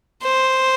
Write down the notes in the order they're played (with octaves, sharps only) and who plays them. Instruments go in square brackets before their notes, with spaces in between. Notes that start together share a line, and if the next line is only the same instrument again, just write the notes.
[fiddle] C5